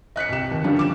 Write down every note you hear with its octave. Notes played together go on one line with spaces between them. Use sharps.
D#5 F#6 B6 C#7
C2 G4 E7
D#2
D3 F3 G3 C#4 D4
D6 E7